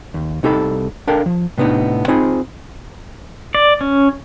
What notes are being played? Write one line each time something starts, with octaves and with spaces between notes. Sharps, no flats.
D#2
C2 D#4 G4 A4 B5
D4 A4 A#4 F5 G5
F3
A2 C3 B3 D4 D#4
C4 D#4 F4 G#4 C5 B5
D5
C#4